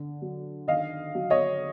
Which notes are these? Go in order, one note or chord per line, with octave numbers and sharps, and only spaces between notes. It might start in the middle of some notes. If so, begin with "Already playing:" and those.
Already playing: D3
F#3
D#3 D#5 F5
F#3
C#5 D#5